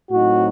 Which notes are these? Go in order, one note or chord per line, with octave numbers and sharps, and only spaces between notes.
A2 F#3 C4 D#4 F#4